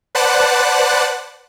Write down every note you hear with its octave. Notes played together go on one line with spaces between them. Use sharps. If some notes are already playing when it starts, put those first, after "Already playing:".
B4 C5 D5 F#5 A5 F#6